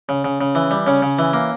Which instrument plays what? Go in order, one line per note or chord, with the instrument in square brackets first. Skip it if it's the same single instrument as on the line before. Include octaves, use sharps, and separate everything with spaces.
[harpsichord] C#3
C#3
C#3
E3
G3
C#3 C#4
C#3
E3
A#3